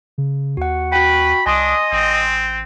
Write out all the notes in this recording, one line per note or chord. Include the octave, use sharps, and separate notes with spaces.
C#3
D#2 F#4 F#5
F#4 B4 G5 B5
C2 D4 D#5 G#5 C6 D#6
A1 C4